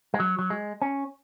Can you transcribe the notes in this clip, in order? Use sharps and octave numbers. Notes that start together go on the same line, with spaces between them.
G#3
F#3
F#3
G#3
C#4